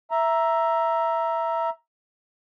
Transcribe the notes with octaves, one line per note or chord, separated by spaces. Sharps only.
E5 A#5